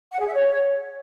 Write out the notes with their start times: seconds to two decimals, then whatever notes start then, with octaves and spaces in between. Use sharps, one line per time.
0.11 F#5
0.19 G#4
0.26 E5
0.34 C#5